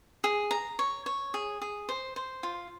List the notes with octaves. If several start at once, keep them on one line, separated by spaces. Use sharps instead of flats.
G#4
A#5
C#5
C#5
G#4
G#4
C5
C5
F4